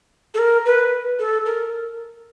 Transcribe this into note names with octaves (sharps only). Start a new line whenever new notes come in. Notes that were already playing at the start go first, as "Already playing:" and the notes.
A4
A#4
B4
A4
A#4